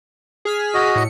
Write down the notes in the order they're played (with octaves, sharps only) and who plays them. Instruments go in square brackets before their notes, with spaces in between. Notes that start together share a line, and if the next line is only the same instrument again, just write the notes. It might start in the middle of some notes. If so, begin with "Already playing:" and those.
[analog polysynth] G#4 F6 B6
[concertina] F#4 D#5
[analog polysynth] A2 C#7